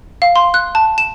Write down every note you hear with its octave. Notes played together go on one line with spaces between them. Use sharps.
F5
C6
F#6
A5
E7